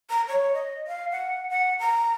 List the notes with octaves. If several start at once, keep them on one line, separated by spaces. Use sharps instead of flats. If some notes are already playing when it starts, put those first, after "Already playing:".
A#5
C#5
D#5
F5
F#5
F#5
A#5